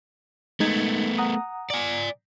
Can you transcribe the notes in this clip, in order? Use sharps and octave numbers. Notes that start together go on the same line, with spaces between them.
G#3 A3 B3 D#4 G#6
F#5 A#5 D#6
D5 G#5